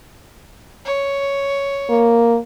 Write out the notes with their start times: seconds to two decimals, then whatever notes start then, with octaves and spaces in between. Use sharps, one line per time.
0.85 C#5
1.89 A#3